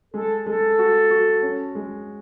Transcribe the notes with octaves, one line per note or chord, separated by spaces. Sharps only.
G#3 A4
G#3 A4
F#4
F#4
C#4
G#3